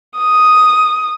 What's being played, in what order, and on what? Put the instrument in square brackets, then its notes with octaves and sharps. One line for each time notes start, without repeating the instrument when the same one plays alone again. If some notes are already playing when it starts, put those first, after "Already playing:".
[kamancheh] D#6